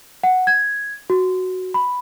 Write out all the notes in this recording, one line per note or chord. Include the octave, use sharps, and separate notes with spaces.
F#5
G#6
F#4
B5